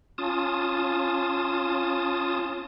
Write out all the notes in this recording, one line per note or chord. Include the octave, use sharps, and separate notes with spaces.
C#4 F4 A5 D#6